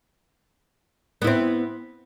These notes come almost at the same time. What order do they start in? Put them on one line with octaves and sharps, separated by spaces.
B3 E4 C4